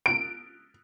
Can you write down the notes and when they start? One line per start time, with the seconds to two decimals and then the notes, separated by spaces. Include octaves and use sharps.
0.06 D7